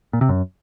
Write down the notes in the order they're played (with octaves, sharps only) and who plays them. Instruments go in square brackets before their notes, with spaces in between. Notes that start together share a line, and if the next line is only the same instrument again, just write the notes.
[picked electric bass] A#2
C3
F#2